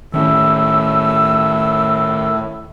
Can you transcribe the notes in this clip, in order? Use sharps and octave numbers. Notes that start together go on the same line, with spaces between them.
A2 D#3 C#4 E6